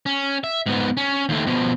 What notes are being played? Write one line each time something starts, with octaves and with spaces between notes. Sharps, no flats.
C#4
E5
G#2 B3
C#4
D#2 A3
B2 F3